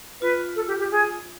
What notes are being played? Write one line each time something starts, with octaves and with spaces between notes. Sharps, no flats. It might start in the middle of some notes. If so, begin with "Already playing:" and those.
F4 B4
A4
G4
G4
G#4